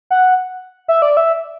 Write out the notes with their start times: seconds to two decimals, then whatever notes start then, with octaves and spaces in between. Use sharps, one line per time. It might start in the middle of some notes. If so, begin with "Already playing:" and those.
0.10 F#5
0.88 E5
1.02 D5
1.17 E5